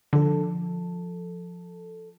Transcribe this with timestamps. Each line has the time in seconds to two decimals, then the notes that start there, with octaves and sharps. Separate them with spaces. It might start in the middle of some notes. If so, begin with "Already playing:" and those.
0.13 D3 F3 A4